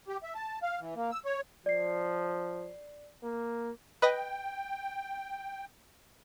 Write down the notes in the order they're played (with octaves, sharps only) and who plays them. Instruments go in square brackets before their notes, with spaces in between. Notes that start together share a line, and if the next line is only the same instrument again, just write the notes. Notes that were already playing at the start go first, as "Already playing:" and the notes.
[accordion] G4
E5
A5
F5
E3
A#3
E6
C#5
[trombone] F3 [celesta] D5 C7
[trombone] A#3
[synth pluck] B4 D#5 A#6 [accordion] G5